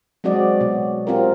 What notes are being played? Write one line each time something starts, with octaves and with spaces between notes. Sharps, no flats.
F#3 G#3 C4 F#4 D5 D#5
B2
C4 F4 G4 A#4